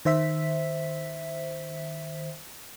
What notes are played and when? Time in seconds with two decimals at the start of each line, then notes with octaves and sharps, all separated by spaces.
0.05 D#3 C5 E5 B6